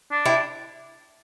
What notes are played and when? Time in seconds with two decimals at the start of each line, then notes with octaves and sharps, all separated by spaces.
0.11 D4
0.26 E4 G4